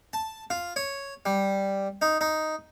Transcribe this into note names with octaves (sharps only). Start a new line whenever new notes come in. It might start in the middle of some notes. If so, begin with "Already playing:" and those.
A5
F4
C#5
G3
D#4
D#4